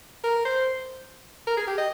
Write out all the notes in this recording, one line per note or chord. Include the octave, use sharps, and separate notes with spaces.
A#4
C5
A#4
G#4
G4
D#5